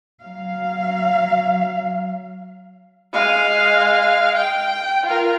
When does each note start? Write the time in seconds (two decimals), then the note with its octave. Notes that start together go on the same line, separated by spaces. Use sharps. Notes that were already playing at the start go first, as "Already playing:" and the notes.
0.21 F#3 F5
3.13 G#3 F5
4.36 G5
5.06 F4 A#4